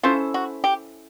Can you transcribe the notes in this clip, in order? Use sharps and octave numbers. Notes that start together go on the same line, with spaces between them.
C#4 E4 F4 A4 C5
F#4
G4